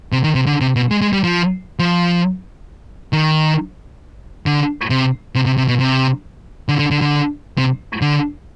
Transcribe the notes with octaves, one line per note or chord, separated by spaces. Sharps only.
C3
D#3
C3
D3
C3
B2
G#3
G#3
G3
F3
F3
D#3
D3
C3
C3
C3
C3
B2
C3
D3
D3
D3
D3
C3
D3